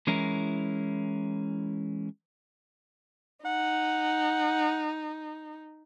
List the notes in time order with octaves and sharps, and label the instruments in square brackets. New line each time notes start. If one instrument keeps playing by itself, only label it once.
[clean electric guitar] E3 G#3 C#4 E4 A#4
[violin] D#4 [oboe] F#5